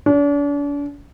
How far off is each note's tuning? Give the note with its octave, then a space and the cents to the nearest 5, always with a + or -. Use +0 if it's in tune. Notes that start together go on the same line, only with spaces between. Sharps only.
D4 -40